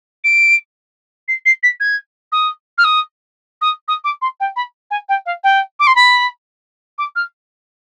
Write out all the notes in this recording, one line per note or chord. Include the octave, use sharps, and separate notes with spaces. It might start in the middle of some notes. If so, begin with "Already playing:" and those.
D7
C7
C7
B6
G#6
D#6
F6
D#6
D#6
D#6
D6
C6
G5
B5
G#5
G5
F5
G5
D6
C6
B5
D6
F6